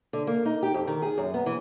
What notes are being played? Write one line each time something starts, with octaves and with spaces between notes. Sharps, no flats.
D3
A#3
D#4
G4
F2
D#3
G#4
F#2
B3
E3